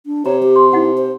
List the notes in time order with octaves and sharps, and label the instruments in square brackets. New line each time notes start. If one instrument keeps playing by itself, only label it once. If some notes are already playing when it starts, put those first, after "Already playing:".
[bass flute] D4
[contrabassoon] C3 [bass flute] C#5 [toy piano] A#5
[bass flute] G4
[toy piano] C6
[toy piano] D#4 F#5 [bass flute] E4
[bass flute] C5